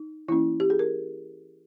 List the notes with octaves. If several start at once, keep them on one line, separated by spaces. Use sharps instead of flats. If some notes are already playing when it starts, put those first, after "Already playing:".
Already playing: D#4
E3 A#3 C#4 E4
G4
G#4
A#4